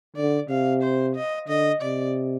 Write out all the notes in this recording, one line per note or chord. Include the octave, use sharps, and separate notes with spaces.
D3 D5
C3 F5
C5
D#5
D3 D#5
C3 D5